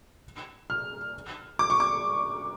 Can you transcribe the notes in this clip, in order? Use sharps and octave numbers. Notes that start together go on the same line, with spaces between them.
F6
D6
C#6
D6